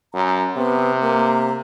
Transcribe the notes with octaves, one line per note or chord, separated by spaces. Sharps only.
F#2 A#5
C3 B3
A#3